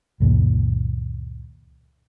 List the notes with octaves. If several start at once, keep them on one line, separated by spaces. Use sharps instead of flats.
C#2 F#2 A#2 D#3